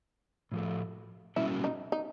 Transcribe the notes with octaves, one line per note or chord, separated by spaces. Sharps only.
A2 F3 A3
B2 G3 A#3 C#4 E4 F#4
D#4
D#4